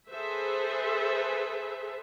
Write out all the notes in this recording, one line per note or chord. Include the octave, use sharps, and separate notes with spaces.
G#4 A4 B4 C5 E5